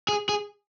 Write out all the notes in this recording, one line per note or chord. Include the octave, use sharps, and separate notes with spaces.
G#4
G#4